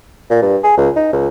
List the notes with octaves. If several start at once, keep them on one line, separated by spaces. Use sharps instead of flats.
A#2
G2
G#4
C#2
D#4
C#2